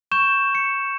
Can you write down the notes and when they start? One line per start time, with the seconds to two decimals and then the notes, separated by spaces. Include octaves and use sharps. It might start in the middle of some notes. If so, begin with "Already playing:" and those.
0.12 C#6 G6 E7
0.55 C#7